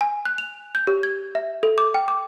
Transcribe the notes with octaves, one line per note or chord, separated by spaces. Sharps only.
G#5
F#6
F7
G6
G4
G#6
E5
A4
D6
G5
D6